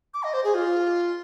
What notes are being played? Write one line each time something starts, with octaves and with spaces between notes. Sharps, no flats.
D6
D#5
C5
G#4
F4